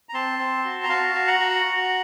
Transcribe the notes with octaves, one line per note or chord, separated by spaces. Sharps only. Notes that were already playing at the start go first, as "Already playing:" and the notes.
A#5
C4 A5 C6
C4
F#4
A#5
F#4 F5 A5
F#4
F#5 A#5
F#4
F#4